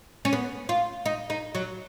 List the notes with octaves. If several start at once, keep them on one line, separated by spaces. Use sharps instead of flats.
C#4
B3
F4
D#4
D#4
F#3